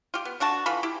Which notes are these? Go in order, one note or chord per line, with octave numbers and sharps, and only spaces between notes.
F4 G4
B3
D3 D4 F#4 A5
E3 F4 A4 B5
E4 G4